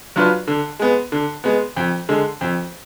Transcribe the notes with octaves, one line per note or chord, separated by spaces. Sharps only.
F#3 D4 F4 B4
D3
G#3 B3
D3
G#3 B3
F2
D3 G#3
F2